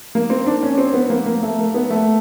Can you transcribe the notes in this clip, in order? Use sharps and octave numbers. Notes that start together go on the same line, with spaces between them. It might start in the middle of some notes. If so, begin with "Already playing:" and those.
A#3
C4
D4
C#4
C4
B3
A#3
A#3
A3
A#3
B3
A3